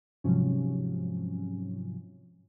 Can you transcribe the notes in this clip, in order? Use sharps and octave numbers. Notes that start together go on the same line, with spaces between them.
G#2 C3 F3 F#3 C#4